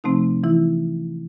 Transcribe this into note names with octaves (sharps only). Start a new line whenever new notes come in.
C3 F3 A3 C4 D#4
E3 E4